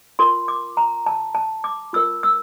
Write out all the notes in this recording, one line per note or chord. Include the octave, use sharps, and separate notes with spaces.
F4 A#4 C6
D6
A#5
A5
A5
D6
F4 A#4 E6
E6